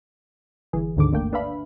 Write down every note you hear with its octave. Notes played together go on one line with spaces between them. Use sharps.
G1 E3 G#4
D2 G#2 D3 D#3 D6
G1 D3 A3 A#3 G5
D4 B4 E5 F5 B5